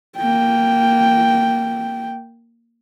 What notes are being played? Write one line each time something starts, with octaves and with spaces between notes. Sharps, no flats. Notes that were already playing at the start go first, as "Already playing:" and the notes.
A#3 G5